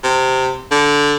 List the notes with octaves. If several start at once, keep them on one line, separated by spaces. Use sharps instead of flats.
C3
D3